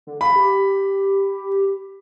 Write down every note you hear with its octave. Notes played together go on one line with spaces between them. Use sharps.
D3
F5 B5
G4